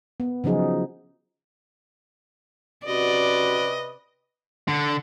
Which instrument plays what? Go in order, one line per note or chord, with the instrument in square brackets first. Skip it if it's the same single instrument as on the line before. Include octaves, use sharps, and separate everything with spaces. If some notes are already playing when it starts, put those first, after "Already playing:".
[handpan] B3
C#3 F3 F#3 D#4 G#4
[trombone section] C3 B4 [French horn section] C#4 F#4 [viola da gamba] D5 [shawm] D#5
[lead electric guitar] D3